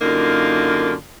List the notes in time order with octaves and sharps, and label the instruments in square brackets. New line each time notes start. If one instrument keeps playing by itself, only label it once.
[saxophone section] F#2 D3 A#3 D#4 F4